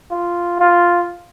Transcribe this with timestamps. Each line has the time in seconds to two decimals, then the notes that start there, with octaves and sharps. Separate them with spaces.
0.11 F4
0.60 F4